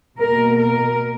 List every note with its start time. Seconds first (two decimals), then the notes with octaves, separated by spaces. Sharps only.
0.19 B2 A#3 A#4
0.58 A#4